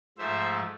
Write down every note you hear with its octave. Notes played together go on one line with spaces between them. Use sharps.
G#2 F3 A3 C5 E5